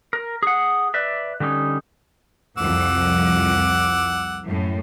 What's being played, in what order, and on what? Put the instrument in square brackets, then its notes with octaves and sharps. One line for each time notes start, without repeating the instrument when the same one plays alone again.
[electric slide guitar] A#4
G#4 F#5
B4 D5 E5
D3 G3 C#4 D#4
[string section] C2 F2 [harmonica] F#5 D6 E6
[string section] F#2 A2